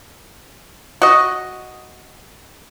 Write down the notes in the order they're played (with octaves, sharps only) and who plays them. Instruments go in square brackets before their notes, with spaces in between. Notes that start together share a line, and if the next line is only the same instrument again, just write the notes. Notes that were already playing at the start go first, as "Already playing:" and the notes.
[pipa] F#4 D#5